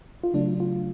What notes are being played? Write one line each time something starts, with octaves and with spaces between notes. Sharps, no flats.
F4
C#3 F#3 A3 D4
F4